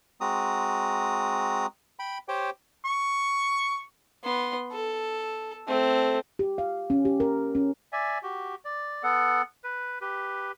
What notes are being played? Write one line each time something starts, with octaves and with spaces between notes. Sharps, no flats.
G#3 C4 F#4 A#5 D#6
G5 B5
G4 C5 C#5 G5
C#6
B3 C6
A4
A3 C4
G4
F5
C#4
G4
A#4
C#4
D5 E5 G#5
F#4 G4
D5
B3 A4 F#5
B4
G4 B4